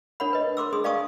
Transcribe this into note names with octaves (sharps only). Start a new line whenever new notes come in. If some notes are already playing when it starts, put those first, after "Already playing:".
D4 A#4 C#5 F#5 B5
B4 D#5
A#4 C6 D6 E6
D4 G#4 C6 D#6
D5 F5 G5 A5 C#6 D#6